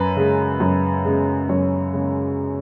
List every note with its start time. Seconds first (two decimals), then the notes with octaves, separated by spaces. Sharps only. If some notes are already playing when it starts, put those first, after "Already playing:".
Already playing: F#2 B4
0.17 C#3 G#3
0.60 F#2
1.05 C#3 G#3
1.49 F#2 C#5
1.93 C#3 G#3